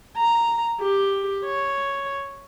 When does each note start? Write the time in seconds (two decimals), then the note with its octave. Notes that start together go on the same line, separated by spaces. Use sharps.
0.17 A#5
0.81 G4
1.45 C#5